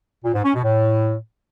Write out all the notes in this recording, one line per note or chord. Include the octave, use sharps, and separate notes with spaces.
A#2
G#2
C#4
B2
A2